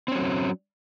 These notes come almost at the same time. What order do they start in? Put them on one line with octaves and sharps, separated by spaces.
C4 C#4 F#3